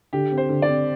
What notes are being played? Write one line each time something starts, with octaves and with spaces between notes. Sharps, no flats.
D3 G4
C4
C5
D3
D5
C4